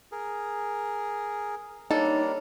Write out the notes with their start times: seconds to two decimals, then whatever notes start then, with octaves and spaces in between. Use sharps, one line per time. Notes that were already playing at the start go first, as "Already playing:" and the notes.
0.12 G#4 A#4
1.91 G3 A#3 D4 D#4 A4 A#4 C#5